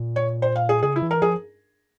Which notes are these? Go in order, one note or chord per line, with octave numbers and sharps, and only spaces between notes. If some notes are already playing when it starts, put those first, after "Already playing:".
Already playing: A#2
C#5
C5
F5
G#4
C#3 G#4
E4
E3
A#4
F3 G#4